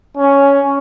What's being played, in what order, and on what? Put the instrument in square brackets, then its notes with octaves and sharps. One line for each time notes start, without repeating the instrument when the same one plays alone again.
[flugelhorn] C#4